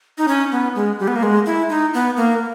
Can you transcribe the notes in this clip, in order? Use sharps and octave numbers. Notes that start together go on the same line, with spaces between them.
D#4
C#4
B3
G#3
G3
B3
A#3
G#3
E4
D#4
B3
A#3